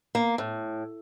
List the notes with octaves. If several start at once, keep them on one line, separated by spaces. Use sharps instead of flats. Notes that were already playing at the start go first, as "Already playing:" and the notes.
A#3
A2